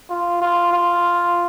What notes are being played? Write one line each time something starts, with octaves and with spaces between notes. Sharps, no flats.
F4
F4
F4